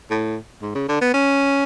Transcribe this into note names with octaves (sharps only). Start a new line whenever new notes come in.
A2
G#2
C#3
D3
B3
C#4